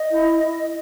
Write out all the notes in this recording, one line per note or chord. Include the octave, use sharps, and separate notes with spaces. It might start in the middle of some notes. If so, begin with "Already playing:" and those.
Already playing: D#5
E4